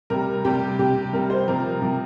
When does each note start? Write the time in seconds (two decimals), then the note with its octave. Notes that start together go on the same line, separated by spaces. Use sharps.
0.10 C3 G3 A#4
0.45 C3 G3 G4
0.79 C3 G3 G4
1.13 C3 G3 A#4
1.30 C5
1.47 C3 F3 A#4
1.82 C3 F3